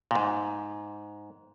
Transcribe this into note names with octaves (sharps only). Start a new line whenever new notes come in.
A#2
G#2